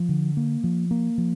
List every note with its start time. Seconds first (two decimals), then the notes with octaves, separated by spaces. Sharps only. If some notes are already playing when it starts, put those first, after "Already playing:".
Already playing: F3
0.09 D3
0.37 A#3
0.64 F3
0.91 A#3
1.18 F3